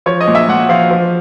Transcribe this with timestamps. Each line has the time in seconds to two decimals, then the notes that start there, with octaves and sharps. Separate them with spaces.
0.06 F3 C#5
0.21 D#5
0.28 A#2
0.35 E5
0.48 A#2 F#5
0.69 F3 F5
0.90 F3